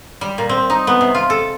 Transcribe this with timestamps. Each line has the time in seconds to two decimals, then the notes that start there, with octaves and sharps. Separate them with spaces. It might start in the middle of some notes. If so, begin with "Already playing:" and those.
0.21 G3
0.38 A#2
0.49 C4
0.70 D#4
0.87 B3
1.01 C3
1.15 F4
1.30 A4